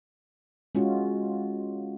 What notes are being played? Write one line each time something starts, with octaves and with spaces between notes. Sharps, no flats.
G#3 C#4 F4 F#4